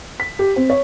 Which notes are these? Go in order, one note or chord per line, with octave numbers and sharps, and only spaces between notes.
B6
G4
C4
C#5